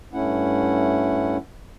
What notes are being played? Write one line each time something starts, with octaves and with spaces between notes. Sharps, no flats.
G2 A3 C#4 E4 F#5